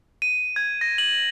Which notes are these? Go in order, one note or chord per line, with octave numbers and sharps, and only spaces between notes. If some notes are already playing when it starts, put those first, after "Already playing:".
D#7
G#6
A#6
F#7